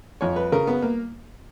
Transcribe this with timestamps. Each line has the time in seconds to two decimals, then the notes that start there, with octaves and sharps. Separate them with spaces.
0.21 F2 C#5
0.36 B4
0.52 C#3 A#4
0.67 B3
0.82 A#3